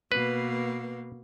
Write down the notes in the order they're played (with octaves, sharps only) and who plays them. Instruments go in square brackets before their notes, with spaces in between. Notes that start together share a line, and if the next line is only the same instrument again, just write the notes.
[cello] B2 A#3 [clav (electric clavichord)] B4